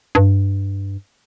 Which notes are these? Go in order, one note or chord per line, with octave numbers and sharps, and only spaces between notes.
G2